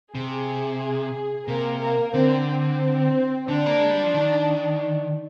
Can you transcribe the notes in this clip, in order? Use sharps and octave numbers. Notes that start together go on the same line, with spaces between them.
C3 G#4
C3 A#3 A#4
A#3 A#4
D3 C4
C4
D3 D4
A#3
G#3
G3
F3
D#3